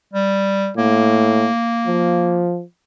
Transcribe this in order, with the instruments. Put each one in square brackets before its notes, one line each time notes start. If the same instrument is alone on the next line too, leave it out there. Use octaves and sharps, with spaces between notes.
[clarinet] G3
[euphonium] A2 [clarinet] A#3
[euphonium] F3